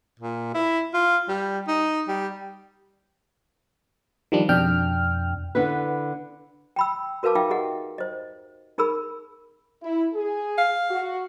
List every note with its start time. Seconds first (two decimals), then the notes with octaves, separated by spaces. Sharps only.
0.20 A#2
0.54 E4
0.94 F4
1.28 G3
1.68 D#4
2.08 G3
4.32 D#3 F3 G3 D4
4.49 F2 B2 D4 G5 F6
5.55 D3 B3 E4 B4
6.76 G5 B5 E6
7.23 F#4 A#4 B4 F5 A5 D6
7.35 D#4 F4 E5 F5 G5 D6
7.50 G4 G#4 D#5 F#5
7.98 C5 D#5
8.78 D#4 G#4 A#4 B5 E6
9.83 E4
10.14 G#4
10.58 F5
10.90 F#4